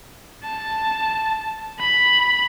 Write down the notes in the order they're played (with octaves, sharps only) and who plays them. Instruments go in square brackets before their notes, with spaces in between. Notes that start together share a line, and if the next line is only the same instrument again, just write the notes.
[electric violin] A5
B5